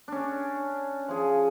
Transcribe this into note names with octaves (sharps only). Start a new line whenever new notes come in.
C#4 D4
F3 G#4